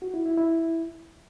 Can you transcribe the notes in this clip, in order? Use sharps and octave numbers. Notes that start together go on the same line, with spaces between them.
F#4
E4
E4
E4